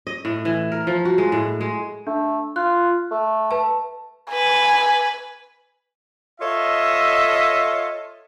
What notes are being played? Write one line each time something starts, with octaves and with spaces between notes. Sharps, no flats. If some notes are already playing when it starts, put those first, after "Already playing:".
D#5
A2
E3
A#4
F3
F#4
G#3
A2
G#3
A3 D4
F4 F#6
A3
B4 A5
B4 G#5
F4 A4 C#5 D#5 E5